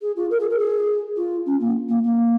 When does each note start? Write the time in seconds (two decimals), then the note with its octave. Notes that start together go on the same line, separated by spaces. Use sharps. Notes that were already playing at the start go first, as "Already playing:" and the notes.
0.02 G#4
0.16 F4
0.30 A#4
0.40 G#4
0.50 A#4
0.59 G#4
1.17 F4
1.46 C#4
1.60 A#3
1.89 A#3
2.04 A#3